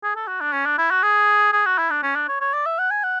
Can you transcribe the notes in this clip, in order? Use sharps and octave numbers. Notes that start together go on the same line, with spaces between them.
G#4
A4
F#4
D4
C#4
D4
E4
F#4
G#4
G#4
F#4
E4
D4
C#4
D4
C#5
C#5
D5
E5
F#5
G#5
F#5